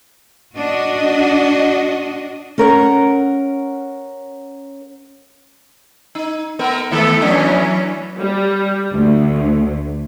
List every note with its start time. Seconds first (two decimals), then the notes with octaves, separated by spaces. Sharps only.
0.57 D4 F#4 D#5
2.58 C#4 A#4 F#5
6.15 D#4
6.59 A3 B3 A#4
6.91 D#3 A3 B3 E4 A4 E5
7.21 E3 F#3 A3 C#4 D4
8.18 G3
8.93 D2